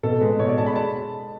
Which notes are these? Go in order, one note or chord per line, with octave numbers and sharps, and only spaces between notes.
B2 A4
G#3 B4
B2 C#5
D5
G#3 A5
B5
A5